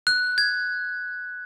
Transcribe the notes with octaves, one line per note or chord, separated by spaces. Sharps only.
F#6
G#6